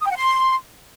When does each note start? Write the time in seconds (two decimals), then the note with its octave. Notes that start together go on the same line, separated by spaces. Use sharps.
0.02 D#6
0.07 G5
0.12 F#5
0.17 C6